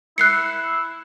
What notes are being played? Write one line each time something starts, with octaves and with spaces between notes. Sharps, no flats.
E4 F#6 C7 C#7